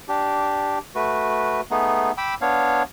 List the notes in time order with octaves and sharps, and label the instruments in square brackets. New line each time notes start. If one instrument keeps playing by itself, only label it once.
[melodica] D4 G4
A3 F#4 B4
A3 B3 D#4 G#4
G5 B5 D6 E6
B3 D4 C#5 F5